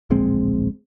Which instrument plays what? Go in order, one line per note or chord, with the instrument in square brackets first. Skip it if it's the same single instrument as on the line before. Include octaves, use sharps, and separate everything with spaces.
[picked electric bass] D1 A#1 G#3 C4